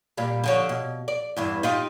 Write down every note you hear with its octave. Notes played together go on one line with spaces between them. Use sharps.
A#2 G3
D3 F3 C#5
B2
D5
E2 G2 E3
D#4 F4 G4